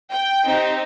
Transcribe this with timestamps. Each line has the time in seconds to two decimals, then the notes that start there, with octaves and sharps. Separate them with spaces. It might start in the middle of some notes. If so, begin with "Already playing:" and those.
0.11 G5
0.43 C4 D#4 G4